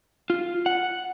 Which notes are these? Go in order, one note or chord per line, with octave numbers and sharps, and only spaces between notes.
F4
F#5